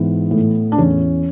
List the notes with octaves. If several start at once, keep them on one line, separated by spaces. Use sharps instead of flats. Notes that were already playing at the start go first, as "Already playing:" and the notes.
Already playing: G#2 E3 B3
A2
D4
E2 C#4